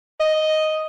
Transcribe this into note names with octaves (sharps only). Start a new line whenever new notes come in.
D#5